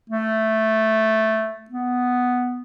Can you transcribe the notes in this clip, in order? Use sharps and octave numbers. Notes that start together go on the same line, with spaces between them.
A3
B3